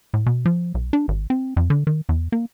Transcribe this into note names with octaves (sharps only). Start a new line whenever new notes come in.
A2
B2
F3
B1
D4
G#1
C4
F2
D3
D#3
E2
A#3